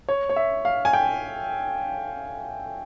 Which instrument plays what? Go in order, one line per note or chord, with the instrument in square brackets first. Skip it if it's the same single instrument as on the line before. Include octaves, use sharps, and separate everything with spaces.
[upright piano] C#5
C#5
E5
F5
G#5
G5